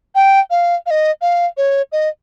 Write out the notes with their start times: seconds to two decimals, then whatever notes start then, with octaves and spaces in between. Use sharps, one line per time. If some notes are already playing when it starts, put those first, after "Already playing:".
0.15 G5
0.50 F5
0.86 F5
0.91 D#5
1.21 F5
1.57 C#5
1.92 D#5